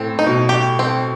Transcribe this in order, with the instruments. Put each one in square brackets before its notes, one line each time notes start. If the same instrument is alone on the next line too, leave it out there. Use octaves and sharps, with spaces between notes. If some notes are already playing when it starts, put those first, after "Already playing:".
Already playing: [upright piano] A2 [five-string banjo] C4
[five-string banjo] D#4
[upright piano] B2
[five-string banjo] G4
C4